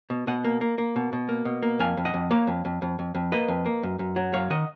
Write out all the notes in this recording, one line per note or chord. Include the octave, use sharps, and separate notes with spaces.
B2
B2 D#5 F#5
A#3
A#3
A#3
B2
B2
A#3
B2
A#3
F2 F5 G#5
F2
D#5 F#5
F2
A#3 C#5 F5
F2
F2
F2
F2
F2
A#3 B4 D#5
F2
A#3
F#2
F#2
F#3
F#2 C#5 F5
D#3 D#5 F#5